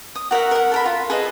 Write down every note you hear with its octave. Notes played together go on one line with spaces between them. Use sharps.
D#6
F#4 A#4 E5 F#5
A#4 F#5
A4 A#4 B5
F4
G#4 A4 B4 D#5